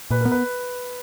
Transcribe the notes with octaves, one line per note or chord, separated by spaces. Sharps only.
A#2 B4
B3 A#4
B4